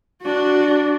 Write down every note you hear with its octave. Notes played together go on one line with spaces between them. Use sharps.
D4 F#4